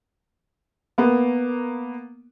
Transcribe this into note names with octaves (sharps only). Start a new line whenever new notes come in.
A#3 B3